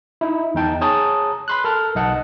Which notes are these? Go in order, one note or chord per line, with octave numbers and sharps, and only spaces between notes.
D#4 E4
E2 D#4 G5 A5
G#4 C#5 A5 A#5 D#6
B5 C6 F#6
A4 A#4 A5 F6
B1 D#5 F#5 A5